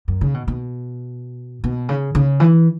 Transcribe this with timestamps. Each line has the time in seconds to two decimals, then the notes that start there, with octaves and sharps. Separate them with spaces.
0.08 F#2
0.21 C#3
0.34 B2
0.48 B2
1.64 B2
1.89 C#3
2.15 C#3
2.40 E3